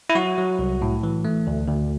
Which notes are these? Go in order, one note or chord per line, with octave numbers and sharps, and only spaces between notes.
E4
F#3 F#4
F#3
C2
A2
E3
A3
D2
D2